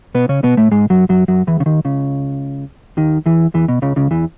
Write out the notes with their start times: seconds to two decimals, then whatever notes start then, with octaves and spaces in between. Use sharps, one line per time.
0.15 B2 B3
0.29 C#3 C#4
0.43 B2 B3
0.57 A2 A3
0.72 G#2 G#3
0.90 F#2 F#3
1.09 F#2 F#3
1.28 F#2 F#3
1.47 E2 E3
1.60 C#3
1.66 D#2 D#3
1.85 C#2 C#3
2.97 D#2 D#3
3.26 E2 E3
3.54 E2 E3
3.68 B2
3.82 C#2 C#3
3.96 C#2 C#3
4.11 E2 E3